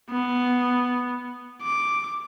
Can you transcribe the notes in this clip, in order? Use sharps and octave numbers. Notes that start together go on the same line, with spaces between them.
B3
D6